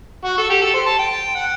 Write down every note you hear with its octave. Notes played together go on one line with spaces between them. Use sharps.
F#4
A4
G4
A4
C5
A5
G5
F#5